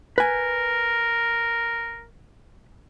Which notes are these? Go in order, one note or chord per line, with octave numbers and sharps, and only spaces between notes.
A#4 B4 G#5